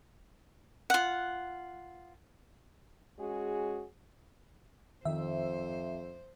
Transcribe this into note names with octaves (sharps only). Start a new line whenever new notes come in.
F4 F#5
G#3 C#4 F#4 G#4
F2 D#3 C5 E5